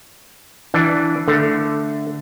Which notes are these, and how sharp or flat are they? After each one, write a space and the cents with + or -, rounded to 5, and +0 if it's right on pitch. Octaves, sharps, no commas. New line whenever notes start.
E3 +0 D4 +0
D3 +0 A3 +0